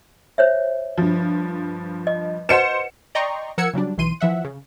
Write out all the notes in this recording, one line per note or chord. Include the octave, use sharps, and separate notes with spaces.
C5 C#5 E5
G2 F3
D#5
B4 C5 D#5 F#5 C#7 E7
D5 D#5 G5 A#5 C6 C#6
F3 A#4 F#5 E6 G#6 C#7
C#3 F#3 G3 D4
B1 E3 C6 D#7
E3 F3 E5 F#5
C#3